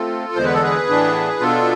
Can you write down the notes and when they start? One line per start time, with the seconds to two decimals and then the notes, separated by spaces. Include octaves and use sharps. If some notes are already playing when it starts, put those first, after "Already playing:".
Already playing: A3 C4 F4 A4
0.36 E2 D3 G#3 B3 C5
0.45 B4
0.54 A4
0.63 G#4 B4
0.88 A2 E3 B3 D4
1.40 B2 B3 D4 F4 A4